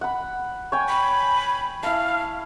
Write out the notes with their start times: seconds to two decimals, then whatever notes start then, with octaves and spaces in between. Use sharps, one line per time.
0.01 F#5 B5
0.72 C#5 G5 G#5
0.88 B5
1.83 E4 F5 A5